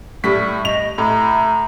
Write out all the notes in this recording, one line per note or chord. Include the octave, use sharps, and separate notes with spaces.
A2 G3 C#6 B6
D#5 F7
A2 A#5